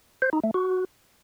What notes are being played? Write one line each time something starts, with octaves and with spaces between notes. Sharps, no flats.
C5
D#4
A3
F#4